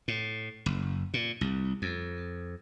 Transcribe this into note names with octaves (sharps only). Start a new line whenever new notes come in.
A2
F#1
A#2
C2
F2